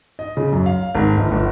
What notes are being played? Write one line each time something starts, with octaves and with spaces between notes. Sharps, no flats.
D#5
C#3
F#2
F5
G#1
G1
G1